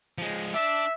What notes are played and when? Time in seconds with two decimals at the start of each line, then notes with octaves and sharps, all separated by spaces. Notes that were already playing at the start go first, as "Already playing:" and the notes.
0.18 F3 G#3
0.54 D4 E5